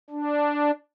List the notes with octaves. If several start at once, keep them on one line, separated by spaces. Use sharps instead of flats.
D4